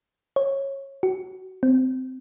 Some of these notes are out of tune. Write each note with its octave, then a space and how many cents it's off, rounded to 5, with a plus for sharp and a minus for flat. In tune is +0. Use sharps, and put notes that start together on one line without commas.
C#5 -20
F#4 +20
C4 -20